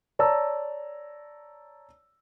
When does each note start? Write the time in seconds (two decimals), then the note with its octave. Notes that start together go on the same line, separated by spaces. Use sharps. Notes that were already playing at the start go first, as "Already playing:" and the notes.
0.19 C#5 D5 A5 A#5 E6